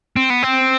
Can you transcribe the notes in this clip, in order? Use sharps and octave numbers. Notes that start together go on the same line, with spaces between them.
C4
B3
C4